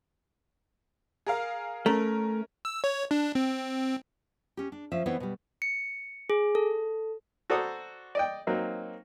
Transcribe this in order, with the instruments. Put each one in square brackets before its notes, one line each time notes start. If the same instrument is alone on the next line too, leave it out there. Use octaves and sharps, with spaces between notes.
[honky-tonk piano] G#4 A#4 F5
[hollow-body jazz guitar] A3 [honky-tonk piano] C#4 A#4
[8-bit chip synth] E6
C#5
D4
C4
[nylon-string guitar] C#4 G4
D4
F3 C#4 E5
E3 B3 C4 E4 C#5 D#5
B2 G3
[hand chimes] C#7
G#4
A4
[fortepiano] F#4 A4 C5 D5 A#5 D#6
D5 D#5 G5
F#3 A#3 C4 D#4